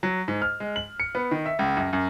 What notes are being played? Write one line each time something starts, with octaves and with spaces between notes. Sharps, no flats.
F#3
G#2
F6
G#3
F#7
C#7
B3
D#3
E5
C#2
F#2
F#2